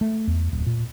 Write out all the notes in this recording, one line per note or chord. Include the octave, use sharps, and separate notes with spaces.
A3
E2
D1
A#2